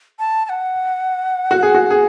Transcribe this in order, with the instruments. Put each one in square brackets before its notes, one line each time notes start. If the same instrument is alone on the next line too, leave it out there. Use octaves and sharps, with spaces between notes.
[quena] A5
A5
F#5
[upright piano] F#4
G#4
F#4
G#4